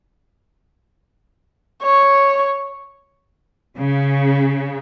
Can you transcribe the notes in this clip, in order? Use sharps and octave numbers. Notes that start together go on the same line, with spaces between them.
C#5
C#3